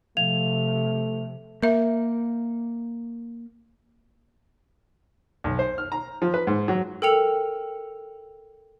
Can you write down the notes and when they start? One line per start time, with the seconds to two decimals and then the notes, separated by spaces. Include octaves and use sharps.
0.17 C3 F3 A3 F7
1.63 A#3 A#4 E5
5.44 B1
5.59 C5
5.78 F6
5.92 A#5
6.22 F3
6.34 B4
6.47 G#2
6.68 F#3
7.02 A4 A#4 G5 E6 C#7 F7